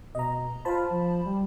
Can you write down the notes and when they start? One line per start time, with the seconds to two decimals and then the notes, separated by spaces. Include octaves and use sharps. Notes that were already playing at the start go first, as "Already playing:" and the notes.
0.15 B2 D#5 A#5
0.65 F4 C5 A5 B5
0.91 F3
1.26 G3